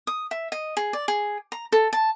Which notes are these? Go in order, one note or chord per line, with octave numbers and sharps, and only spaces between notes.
D#6
E5
D#5
G#4
D5
G#4
A#5
A4
A5